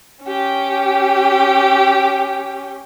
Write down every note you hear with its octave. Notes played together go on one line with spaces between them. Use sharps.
C#4 G4